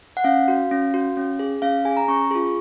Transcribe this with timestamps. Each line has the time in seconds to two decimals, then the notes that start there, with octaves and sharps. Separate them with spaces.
0.17 F#5
0.24 C#4 F5
0.48 F#4
0.71 C#4
0.94 F#4
1.17 C#4
1.39 G#4
1.62 C#4 F5
1.85 G#4 G#5
1.97 A#5
2.08 C#4 C#6
2.31 F4 G#4